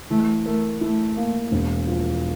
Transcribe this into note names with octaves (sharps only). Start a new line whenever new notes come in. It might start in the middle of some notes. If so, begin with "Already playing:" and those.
E3 A3
A3 A#4
A3 E4
A#3
E1
F3